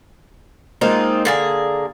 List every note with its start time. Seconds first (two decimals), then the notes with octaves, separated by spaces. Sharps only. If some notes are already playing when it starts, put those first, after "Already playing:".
0.81 G#3 A#3 C4 D#4 F4
1.25 D3 A#3 G#4 A6